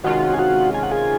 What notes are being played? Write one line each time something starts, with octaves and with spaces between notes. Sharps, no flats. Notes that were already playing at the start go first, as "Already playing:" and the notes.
C3 D#3 G#3 C#4 F4 F#4 F#5
G#5
F#4 F#5
G#5
F#5
G#4 G#5